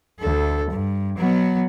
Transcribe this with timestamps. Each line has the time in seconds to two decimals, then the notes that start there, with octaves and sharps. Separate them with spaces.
0.20 D2 A4
0.71 G2
1.18 F#3 B3